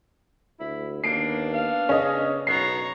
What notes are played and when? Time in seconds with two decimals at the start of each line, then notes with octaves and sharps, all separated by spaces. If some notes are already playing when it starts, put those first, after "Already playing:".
0.60 D2 E4
1.04 D#2 A#3 B3 D4 C7 D7
1.53 F5
1.89 C#3 C#4 D#5
2.47 B1 B3 C#5 A#5 C7